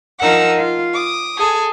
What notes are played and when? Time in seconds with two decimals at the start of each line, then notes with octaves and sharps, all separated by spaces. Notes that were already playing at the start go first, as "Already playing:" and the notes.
0.19 F3 D#4 A#4 F#5 E6
0.57 F4
0.93 D6 D#6
1.37 G#4 A4 G#5